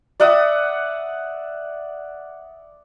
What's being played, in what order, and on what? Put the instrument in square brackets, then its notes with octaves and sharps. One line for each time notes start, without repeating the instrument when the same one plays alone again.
[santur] D5 E5 F#5 D#6